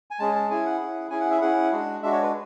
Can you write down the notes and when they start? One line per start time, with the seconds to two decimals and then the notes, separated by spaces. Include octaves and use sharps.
0.11 G#5
0.19 G#3 C#4 G#4 A5
0.35 A5
0.50 C#4 E4 G#4 G#5
0.66 F#5
0.81 C#4 E4 G#4
1.10 C#4 E4 G#4 G#5
1.21 F#5
1.31 E5
1.41 C#4 E4 G#4 F#5
1.72 G#3 D4 F#4
2.02 G#3 D4 F#4 E5
2.12 C#5
2.23 B4